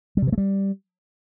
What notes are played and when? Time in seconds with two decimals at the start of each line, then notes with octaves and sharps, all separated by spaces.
0.17 G3
0.22 C3
0.27 E3
0.32 A3
0.38 G3